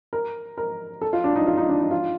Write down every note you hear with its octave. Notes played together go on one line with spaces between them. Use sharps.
A#4
A#4
A4
F4
D4
D#4
F4
D#4
D4
D#4
F4